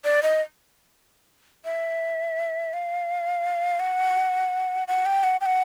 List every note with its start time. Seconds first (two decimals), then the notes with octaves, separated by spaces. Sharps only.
0.04 D5
0.23 D#5
1.65 E5
2.73 F5
3.80 F#5
4.88 F#5
5.06 G5
5.23 F#5
5.41 G5
5.46 F#5